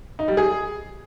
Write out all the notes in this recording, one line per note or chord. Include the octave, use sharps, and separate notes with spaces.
D#4
G3
G#4